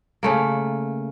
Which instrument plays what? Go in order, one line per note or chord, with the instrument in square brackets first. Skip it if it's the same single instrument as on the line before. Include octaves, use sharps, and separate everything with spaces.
[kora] C#3 A3 A#3